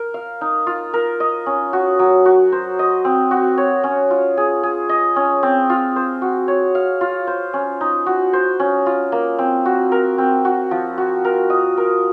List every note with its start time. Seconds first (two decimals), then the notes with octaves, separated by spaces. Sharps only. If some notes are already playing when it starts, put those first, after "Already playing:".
Already playing: A#4
0.14 F5
0.41 D#4
0.67 F4
0.93 A#4
1.20 D#5
1.46 C#4
1.73 F#4
1.99 F#3
2.25 F#4
2.52 C5
2.79 D#5
3.05 C4
3.31 F#4
3.58 C#5
3.84 C#4
4.10 F4
4.37 G#4
4.63 G#4
4.89 D#5
5.16 C#4
5.43 C4
5.69 F4
5.96 C5
6.22 F#4
6.48 C#5
6.75 F5
7.01 F4
7.27 C5
7.53 C#4
7.81 D#4
8.06 F#4
8.33 C5
8.59 C#4
8.86 F4
9.12 A#3
9.39 C4
9.65 F#4
9.92 A#4
10.18 C4
10.45 F#4
10.71 F3
10.98 F#4
11.25 A#4
11.50 D#5
11.77 A#4